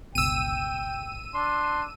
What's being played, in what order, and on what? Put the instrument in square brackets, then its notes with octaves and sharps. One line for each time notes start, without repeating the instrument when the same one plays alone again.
[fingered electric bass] G1 C#2 B2 [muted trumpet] G5 [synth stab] E6 D#7
[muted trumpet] D4 [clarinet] C6